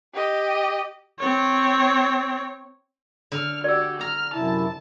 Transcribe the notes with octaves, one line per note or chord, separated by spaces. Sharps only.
G4 D#5
C4 C#5
D3 F6
F#4 G4 D5 E6
A#5 F6
F#2 C3 E4 A5